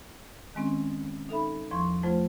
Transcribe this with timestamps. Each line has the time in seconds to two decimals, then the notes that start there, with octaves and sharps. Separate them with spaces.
0.55 D#3 G#3 C4 C#4
1.29 D#4 A4 E5 B5
1.71 E2 F3 C6 C#6
2.03 F3 F#3 A3 F4 C5